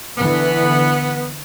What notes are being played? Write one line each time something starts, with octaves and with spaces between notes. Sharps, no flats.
D3 E3 B3